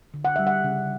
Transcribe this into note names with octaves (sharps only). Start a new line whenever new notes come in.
D3
F#5
G3 E5
F#5
C#3